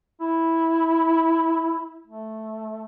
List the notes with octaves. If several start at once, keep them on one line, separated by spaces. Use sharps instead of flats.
E4
A3